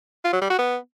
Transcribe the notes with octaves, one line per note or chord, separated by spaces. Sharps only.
F4
F#3
G3
F#4
B3